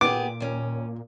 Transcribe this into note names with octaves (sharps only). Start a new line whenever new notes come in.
A#2 B3 G4 G#4 D6
D#2 C#4